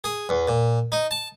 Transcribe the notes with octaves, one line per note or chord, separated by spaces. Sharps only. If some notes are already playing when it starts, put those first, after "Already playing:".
G#4
E2
A#2
D#4
A5